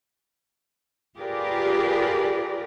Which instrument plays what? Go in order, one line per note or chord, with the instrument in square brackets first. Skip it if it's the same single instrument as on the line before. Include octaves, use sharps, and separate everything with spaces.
[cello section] F4 G4 G#4 A#4 B4 D5